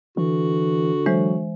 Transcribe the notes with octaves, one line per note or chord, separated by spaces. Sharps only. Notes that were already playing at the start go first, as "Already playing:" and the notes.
D3 E3 F#4
E3 F#3 G#3 C5